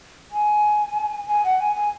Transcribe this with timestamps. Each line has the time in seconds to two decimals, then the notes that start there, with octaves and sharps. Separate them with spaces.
0.31 G#5
1.27 G#5
1.44 F#5
1.60 G#5
1.75 G#5